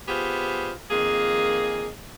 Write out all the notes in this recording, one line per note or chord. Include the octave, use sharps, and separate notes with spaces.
B3 F4 G4 G#4 C5
F2 D#3 A#3 G#4